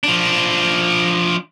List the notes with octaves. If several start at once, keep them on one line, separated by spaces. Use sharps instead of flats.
F3 D4